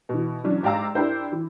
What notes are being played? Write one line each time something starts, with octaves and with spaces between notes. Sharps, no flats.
B2 E3
E3 F#3 C#4 D4
G#2 G4 D5 F5 A#5 E6
D4 E4 G4 A#4 C5
E3